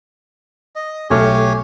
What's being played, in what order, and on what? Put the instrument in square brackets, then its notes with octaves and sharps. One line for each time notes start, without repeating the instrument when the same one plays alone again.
[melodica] D#5
[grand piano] B1 A3 F6 [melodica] G4 C#5 G#5